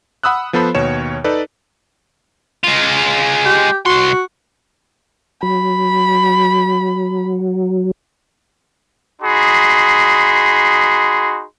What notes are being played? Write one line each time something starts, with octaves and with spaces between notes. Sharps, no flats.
F#5 B5 D#6 E6 F#6
F3 B3 A4 C5 B5
D#2 B2 C#5 E7
D#4 A4 B4 D5
G#3 F4
G4
C2 F#4 C6
F#3 B5
D#4 F#4 G#4 B5 C6